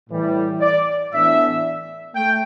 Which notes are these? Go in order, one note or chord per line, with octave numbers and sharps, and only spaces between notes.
A2 E3 G3
D5
A2 E3 B3 D4 E5
A3 G5